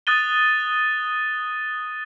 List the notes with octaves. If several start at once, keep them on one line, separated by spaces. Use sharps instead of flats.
D#6 F#6 A6 D#7 G7